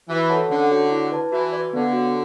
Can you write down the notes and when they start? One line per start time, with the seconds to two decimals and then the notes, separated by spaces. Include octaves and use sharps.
0.09 E3 F#4
0.29 A4 C#5 F#5 A5
0.50 D3 C#4
0.71 F#4 C#5 F#5
0.91 E4
1.12 B4 D5 A5
1.32 E3 F#4
1.53 B4 D5
1.73 D3 B3
1.93 F#4 C#5